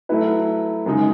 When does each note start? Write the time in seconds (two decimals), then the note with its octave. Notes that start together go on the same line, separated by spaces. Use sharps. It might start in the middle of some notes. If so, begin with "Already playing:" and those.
0.09 F#3 A3 E4 B4
0.86 F#2 C#3 G#3 D#4